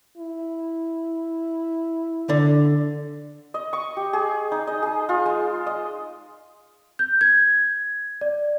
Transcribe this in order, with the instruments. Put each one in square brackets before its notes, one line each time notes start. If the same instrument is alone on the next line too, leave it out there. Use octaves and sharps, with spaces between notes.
[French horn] E4
[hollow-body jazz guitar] D3
[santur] D#5
C#6
G4
G#4
D#4
D#5
G#4
F4
G#3
D#5
[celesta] G6
G#6
D5